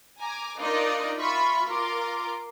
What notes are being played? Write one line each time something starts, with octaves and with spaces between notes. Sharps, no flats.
G#5 A#5 D6
D4 D#4 F4 A#4 D5 D#5
F4 E5 B5 C#6
F4 A#4 C6 D6